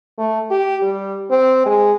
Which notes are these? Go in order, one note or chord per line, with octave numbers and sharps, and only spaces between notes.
A3
G4
G3
C4
G#3